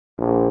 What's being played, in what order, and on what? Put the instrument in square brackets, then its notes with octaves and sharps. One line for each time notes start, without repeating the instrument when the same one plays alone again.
[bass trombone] A#1